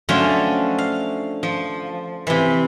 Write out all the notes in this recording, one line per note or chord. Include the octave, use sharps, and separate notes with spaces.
D3 F3 F#3 A3 C#4 F4
F5
F3
C3 E3